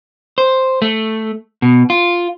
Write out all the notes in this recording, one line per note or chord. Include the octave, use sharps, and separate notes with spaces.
C5
A3
B2
F4